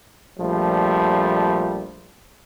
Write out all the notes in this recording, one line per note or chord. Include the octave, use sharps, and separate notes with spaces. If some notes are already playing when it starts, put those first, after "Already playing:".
A#1 F3 G3 A3